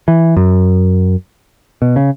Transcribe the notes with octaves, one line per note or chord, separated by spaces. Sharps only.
E3
F#2
B2
C#3